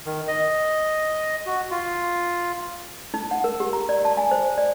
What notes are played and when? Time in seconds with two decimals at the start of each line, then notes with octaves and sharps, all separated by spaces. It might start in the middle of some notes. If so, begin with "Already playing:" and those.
0.06 D#3
0.28 D#5
1.46 F#4
1.71 F4
3.14 D#4
3.31 F#5
3.44 A#4
3.60 G4
3.73 A#5
3.89 D5
4.05 A5
4.17 G#5
4.31 C5
4.58 D5